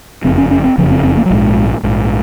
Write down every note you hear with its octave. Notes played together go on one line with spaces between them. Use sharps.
F#1 F2 C#3 C4
C#4
C#4
C4
F#1 F2 C#3 F3
C4
C4
A#3
F#3
A#1 G#2 G#3
A#1 G#2